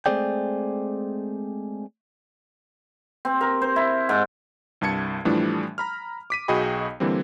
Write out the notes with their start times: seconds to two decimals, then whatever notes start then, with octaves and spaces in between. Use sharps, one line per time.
0.06 G#3 A3 C4 G#4 D5 G5
3.25 C4
3.41 A#4
3.62 C5
3.76 E4
4.09 G#2
4.81 C2 G2 A5 G#6 C#7
5.25 A2 E3 F3 G3 A3 D4
5.78 A#5 B5 F6
6.30 D6 B6 D#7
6.48 B1 F#4 G#4 D#5 G5 B5
7.00 D3 E3 G3 A#3 C4